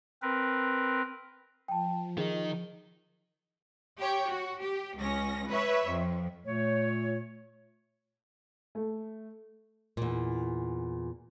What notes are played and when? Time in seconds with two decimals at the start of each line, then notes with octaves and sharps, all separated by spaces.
0.22 C4 A#4 B4
1.68 F3 G5 A5
2.18 D#3 D#4 G#4
4.00 G4 C#5 G5
4.31 F#4
4.61 G4
4.97 C#2 C#4 A#6
5.48 B4 C#5 E5
5.88 F2
6.45 A#2 A3 C#5
8.75 A3
9.97 E2 A#2